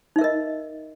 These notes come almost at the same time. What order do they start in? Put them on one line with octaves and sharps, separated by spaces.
D#4 E5 A#4 D#5